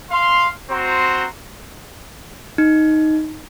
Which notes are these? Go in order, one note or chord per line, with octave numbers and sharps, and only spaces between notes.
F5 C6
C4 F#4 C5 A#5 C6
D#4